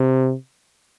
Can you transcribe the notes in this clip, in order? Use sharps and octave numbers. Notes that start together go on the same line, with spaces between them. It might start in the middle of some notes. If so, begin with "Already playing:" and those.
Already playing: C3